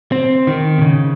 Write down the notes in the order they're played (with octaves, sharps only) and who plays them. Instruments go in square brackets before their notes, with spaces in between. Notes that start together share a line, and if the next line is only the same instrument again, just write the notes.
[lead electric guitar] C4
D#3
C3
C#3